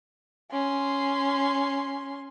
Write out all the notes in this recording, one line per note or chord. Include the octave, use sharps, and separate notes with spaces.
C#4 C6